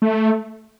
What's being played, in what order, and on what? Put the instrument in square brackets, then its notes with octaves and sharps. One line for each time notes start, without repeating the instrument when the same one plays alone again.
[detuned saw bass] A3